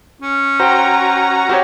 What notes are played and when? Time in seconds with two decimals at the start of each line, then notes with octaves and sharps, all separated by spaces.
0.22 C#4
0.60 F#4 C5 G5 A#5
1.49 C4 F#4 G4 C#5